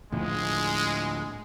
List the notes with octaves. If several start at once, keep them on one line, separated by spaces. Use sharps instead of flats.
D2 A2 F3 G#3